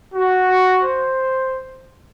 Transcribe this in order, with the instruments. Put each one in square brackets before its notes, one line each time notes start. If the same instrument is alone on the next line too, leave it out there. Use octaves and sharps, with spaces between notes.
[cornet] F#4
C5